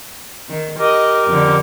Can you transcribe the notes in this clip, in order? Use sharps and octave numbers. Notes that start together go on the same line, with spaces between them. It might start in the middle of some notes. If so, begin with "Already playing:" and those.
D#3
G4 A#4 D#5
F2 D3